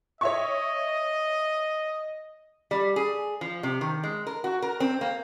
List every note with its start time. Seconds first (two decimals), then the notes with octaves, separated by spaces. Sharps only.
0.21 C#5 D#5 E5 C#6
2.71 G3
2.96 G#4
3.41 F3
3.63 C3
3.81 D#3
4.04 G#3
4.27 A#4
4.44 F#4
4.62 A#4
4.80 C4
5.01 A#3